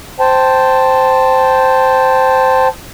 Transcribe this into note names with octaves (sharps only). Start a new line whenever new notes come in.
C5 G5 A5